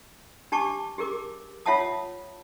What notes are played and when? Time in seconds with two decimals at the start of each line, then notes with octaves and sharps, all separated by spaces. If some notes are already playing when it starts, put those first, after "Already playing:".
0.52 D4 G4 A5 C#6 D6
0.98 G4 G#4 A#4 D6
1.66 F4 C#5 E5 F#5 A5 D#6